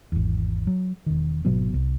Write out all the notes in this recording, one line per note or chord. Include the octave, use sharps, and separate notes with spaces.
G#1 E2
F#3
E1 D#3
G#1 B2 F#3 B3
C2